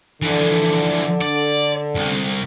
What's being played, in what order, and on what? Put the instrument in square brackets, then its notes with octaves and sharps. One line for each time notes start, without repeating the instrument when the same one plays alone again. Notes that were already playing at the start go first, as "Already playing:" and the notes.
[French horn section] D3 [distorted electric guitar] E3 F3
[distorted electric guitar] D5
C2